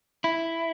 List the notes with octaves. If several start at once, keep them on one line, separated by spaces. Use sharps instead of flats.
E4